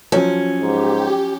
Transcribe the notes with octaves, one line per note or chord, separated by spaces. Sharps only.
F3 F#3 C#4
G#2 G4